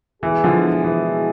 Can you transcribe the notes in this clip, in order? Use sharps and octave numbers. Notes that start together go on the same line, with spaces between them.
B2 E3 G#3 B3 E4 G#4
D3 F3
E3